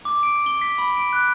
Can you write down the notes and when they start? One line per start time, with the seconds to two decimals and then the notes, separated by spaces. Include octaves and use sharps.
0.05 D6
0.23 D7
0.46 G7
0.61 B6
0.78 B5
0.97 D7
1.13 F#6